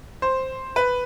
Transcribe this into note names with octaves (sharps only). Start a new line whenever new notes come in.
C5
B4